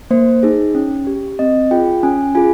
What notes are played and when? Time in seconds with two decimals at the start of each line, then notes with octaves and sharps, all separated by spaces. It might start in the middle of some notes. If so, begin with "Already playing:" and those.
0.11 A#3 C5
0.43 D#4 G#4
0.75 C#4
1.07 G4
1.39 C4 D#5
1.71 F4 G#4 G5
2.03 C#4 G#5
2.35 F4 G#4 G#5